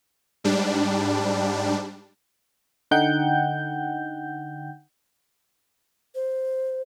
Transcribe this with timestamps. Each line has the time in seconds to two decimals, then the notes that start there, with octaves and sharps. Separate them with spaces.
0.44 G#2 G3 D4
2.91 D3 D#4 F#5 G5 G6
6.15 C5